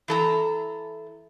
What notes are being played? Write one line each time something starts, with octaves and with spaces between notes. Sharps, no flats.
E3 A4 A#5